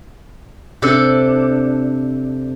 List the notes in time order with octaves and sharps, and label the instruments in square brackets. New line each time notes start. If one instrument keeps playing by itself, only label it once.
[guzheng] C3 D4 A4